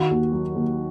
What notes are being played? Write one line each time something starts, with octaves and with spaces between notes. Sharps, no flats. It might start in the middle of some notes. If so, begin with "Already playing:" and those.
Already playing: D#3 F#4
D#2
F#3
D#2